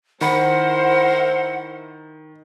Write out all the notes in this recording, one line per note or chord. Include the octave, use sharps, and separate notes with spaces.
D#3 E4 A#4 C5 F#5 B5